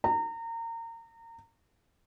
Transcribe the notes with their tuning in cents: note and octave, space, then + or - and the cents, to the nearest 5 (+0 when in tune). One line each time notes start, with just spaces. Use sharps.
A#5 -30